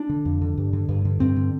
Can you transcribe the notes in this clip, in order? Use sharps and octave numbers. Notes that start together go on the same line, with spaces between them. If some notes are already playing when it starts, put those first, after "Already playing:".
Already playing: D4
D3
F2
D3
G2
D3
G2
D3
G2 C4
D3